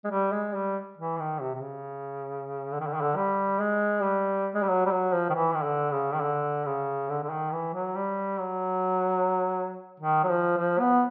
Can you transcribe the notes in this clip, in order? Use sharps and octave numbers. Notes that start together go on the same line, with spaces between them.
G#3
G3
G#3
G3
E3
D#3
C3
C3
C#3
D3
D#3
D3
D#3
D3
G3
G#3
G3
G#3
G3
F#3
G3
F#3
F3
D#3
E3
D#3
D3
C#3
D#3
D3
C#3
D3
D3
D#3
E3
F#3
G3
F#3
D#3
F#3
F3
F3
B3